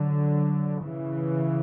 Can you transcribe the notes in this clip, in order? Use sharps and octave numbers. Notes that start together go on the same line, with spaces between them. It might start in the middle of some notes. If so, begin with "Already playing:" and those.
Already playing: D3 F#3
C#3 E3